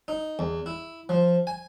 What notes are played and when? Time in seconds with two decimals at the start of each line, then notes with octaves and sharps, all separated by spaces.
0.08 D#4
0.39 E2
0.66 E4
1.09 F3
1.47 G#5